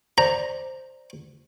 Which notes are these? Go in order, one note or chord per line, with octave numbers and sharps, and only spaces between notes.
C5 D5 A#5